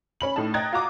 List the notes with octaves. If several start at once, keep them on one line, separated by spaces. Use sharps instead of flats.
C#4 B5 F#7
A2 D#4 A5
D#5 G5 A#5 F#6 G#6 A6
F4 F#4 A#5 D6 D#6